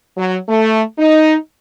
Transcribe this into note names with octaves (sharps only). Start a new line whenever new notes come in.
F#3
A3
D#4